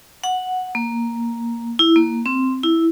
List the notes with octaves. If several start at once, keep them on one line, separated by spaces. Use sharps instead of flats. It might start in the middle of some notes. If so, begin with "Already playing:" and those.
F#5
A#3
E4
A#3
C4
E4